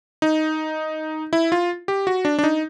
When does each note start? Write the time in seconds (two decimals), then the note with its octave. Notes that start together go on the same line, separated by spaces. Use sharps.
0.22 D#4
1.33 E4
1.52 F4
1.88 G4
2.07 F#4
2.25 D4
2.39 D4
2.44 D#4